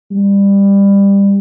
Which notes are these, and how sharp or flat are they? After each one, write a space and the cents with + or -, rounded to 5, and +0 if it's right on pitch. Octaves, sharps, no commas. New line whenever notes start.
G3 +20